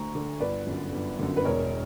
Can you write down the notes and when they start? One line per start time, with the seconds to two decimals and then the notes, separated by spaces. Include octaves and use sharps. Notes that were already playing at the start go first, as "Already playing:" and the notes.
Already playing: D2 D3 A#5 C#6
0.15 D3
0.40 G1 B4 D5
0.66 F#2 D3
0.92 G1
1.19 F#2 D3
1.37 B4
1.45 E1 A#4 C#5